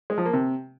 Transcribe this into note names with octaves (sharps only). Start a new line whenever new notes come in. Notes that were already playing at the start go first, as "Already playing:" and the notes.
G#3
F3
A#3
C3